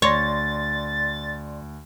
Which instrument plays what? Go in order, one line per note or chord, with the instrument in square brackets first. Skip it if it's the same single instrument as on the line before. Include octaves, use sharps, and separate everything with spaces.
[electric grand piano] D2 [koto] C#5 [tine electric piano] D5 C6 A#6 [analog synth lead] A6